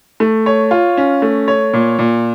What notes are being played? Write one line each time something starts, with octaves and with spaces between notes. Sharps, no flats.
A3
C#5
F4
C#4
A3
C#5
A#2
A#2